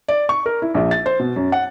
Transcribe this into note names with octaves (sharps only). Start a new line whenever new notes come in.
D5
C#6
A#4
E4
A#1
A6
C5
B2
F#2
F#5